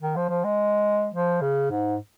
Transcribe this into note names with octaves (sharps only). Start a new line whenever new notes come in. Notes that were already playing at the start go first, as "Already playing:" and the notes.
D#3
F3
F3
G#3
F3
C#3
G#2